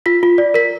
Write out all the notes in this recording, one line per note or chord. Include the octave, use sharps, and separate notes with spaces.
F4 B6
F4
D5
A#4 B6